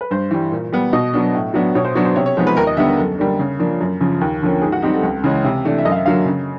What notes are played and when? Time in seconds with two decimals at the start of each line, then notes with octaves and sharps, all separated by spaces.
0.01 B4
0.11 G2 C5
0.31 E3 G3
0.52 A#2
0.72 G3 B3
0.93 B2 D#5
1.14 F#3 B3 D4
1.35 A2
1.54 F#3 B3 D4
1.75 B2 C#5
1.85 C5
1.95 F#3 B3 D4 C#5
2.05 C5
2.16 C3 C#5
2.26 C#5
2.37 F3 G#3 B3 D#4 C5
2.47 B4
2.57 D#2 A#4
2.67 D#5
2.77 D3 G3 B3 E5
2.88 A#4
2.98 F#2 A4
3.18 D3 G3 A#3 D4
3.39 C#3
3.59 F3 A#3 D4
3.81 F#2
4.01 C#3 F3
4.21 D#2
4.42 D3 F3 A#3 C#4
4.62 G#2 G#4
4.72 F#4
4.82 D#3 G3 C4 D#4 G4
4.93 A4
5.03 C#2
5.24 C#3 E3 G#3 C#4
5.45 C3
5.65 E3 A3 D4
5.78 E5
5.85 F#2 D#5
5.92 F5
5.96 E5
6.06 D3 F#3 A#3 F5
6.26 C#3